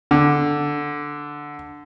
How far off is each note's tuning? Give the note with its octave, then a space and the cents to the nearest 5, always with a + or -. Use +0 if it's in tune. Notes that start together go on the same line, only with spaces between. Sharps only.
D3 +0